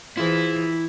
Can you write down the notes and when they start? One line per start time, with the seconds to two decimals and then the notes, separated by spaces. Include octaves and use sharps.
0.17 E3 E4 F4 G#4 C5